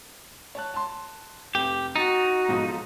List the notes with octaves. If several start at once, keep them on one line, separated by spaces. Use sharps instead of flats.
C#5 A5 F#6
A5 C6
F1 G4
D#4 F#4 A6
B1 G#2 F3